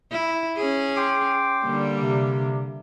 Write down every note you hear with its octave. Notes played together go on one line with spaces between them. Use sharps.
E4
C#4 G#4
G5 C6 D6
D3 G3 A#3
C3